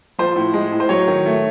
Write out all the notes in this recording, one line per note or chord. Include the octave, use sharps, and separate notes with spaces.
F3 C5
A2
G#3
A2
C5
F#3 C#5
D#3
A3